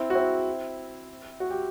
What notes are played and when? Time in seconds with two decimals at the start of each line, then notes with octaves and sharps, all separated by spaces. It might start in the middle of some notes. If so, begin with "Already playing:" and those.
Already playing: C4 E4
0.10 F#4
0.15 C4 E4
1.40 F#4
1.51 G4